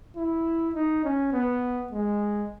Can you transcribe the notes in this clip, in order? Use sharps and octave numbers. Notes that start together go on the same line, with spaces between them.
E4
D#4
C#4
B3
G#3